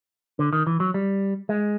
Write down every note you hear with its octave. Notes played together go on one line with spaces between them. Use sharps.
D3
D#3
E3
F#3
G3
G#3